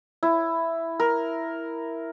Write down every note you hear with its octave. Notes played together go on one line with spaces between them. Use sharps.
E4
A#4